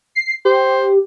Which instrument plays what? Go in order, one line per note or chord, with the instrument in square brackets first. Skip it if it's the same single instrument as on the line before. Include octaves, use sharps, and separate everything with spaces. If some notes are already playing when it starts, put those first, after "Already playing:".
[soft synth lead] C7
[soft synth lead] G4 [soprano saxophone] C5